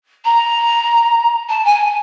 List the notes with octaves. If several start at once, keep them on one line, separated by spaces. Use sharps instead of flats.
A#5
A5
G#5